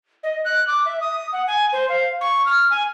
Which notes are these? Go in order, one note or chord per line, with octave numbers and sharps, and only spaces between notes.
D#5
F#6
D6
E5
D#6
F#5
G#5
C5
F5
C#6
F6
G#5